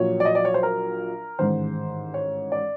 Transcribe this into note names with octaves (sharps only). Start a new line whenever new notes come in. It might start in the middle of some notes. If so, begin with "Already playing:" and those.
Already playing: A#1 A#2 F#3 C#5
D5
D#5
D5
C#5
C5
A#4
A1 G#2 D#3 G#3 C5
C#5
D5